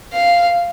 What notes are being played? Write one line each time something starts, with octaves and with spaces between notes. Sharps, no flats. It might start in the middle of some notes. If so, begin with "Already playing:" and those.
F5